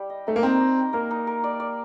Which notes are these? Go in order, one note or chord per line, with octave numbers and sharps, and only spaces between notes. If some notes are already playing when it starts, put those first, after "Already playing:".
Already playing: G3 G4
D#5
A3 D#4
A#3
C4 D#4
D#5
A#4
A#3 A#4
D#4
A#4
D5
D5